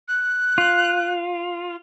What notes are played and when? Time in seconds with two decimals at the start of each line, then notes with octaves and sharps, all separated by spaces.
0.08 F#6
0.58 F4